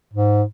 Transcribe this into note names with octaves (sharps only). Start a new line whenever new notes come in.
G#2